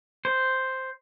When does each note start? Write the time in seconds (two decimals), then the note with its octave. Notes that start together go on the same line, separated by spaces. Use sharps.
0.25 C5